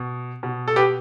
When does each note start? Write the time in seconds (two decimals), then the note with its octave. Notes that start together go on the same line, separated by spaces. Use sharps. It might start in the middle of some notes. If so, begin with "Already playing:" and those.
Already playing: B2
0.43 B2
0.68 A4
0.76 G4 B4